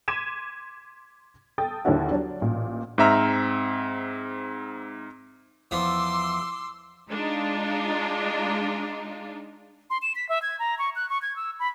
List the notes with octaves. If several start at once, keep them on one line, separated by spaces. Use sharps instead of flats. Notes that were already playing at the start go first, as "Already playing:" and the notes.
C6 D6 G#6 B6 D#7 E7
A4 G5 D#6 A6
D#2 D3 A#3 D4 E4 F#4
F#3 D4
A1 A#2
G#2 C4 E5 A#5 F6
E2 F3 C6 D6 E6
G#3 D4 D#4 F4
C6
E7
B6
E5
G#6
A#5
C#6
F#6
C#6
G#6
E6
B5